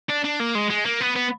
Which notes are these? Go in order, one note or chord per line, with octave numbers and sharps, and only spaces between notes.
D4
D4
A#3
G#3
G#3
A#3
B3
B3